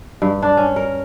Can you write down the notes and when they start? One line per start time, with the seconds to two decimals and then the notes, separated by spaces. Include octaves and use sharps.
0.22 G2
0.42 D4
0.57 C#4
0.76 A#4